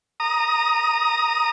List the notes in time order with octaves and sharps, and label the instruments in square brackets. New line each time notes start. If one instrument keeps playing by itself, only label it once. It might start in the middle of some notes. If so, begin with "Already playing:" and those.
[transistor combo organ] A#5 D#6